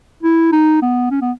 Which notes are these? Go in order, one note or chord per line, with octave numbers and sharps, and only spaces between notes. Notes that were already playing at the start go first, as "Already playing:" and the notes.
E4
D#4
B3
C#4
B3